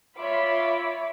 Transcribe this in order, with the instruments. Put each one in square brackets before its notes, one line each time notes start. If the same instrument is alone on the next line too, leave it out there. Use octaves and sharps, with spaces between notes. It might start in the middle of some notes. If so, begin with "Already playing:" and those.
[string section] F4 B5 C6 [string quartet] C#5 E5 D6